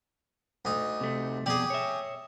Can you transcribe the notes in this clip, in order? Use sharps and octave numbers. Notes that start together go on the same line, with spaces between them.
D2 D#4
C3 A3
F2 B2 G4 G#4 D5
C#5 E5